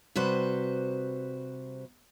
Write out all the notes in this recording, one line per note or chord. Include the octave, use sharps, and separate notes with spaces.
C3 G3 F#4 B4 C5